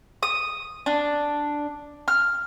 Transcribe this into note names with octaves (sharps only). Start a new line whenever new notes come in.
D#6
D4
F6